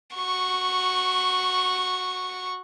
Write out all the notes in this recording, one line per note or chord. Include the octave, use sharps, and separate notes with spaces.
F#4 C#6